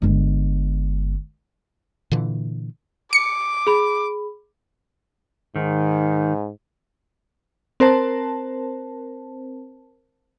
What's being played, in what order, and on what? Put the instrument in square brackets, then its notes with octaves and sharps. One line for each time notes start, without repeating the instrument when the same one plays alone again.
[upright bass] G1 G#3
[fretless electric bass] A#2 D3 E3
[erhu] D6 [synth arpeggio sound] C#7
[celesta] G#4 B5
[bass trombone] G#2 [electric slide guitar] D#3
[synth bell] C4 A#4 C5 A5